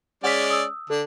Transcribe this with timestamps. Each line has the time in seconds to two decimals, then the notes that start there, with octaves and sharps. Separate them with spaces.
0.24 G#3 C#4 D5 F#5 B6
0.50 D#6 E6
0.90 D3 D4 A4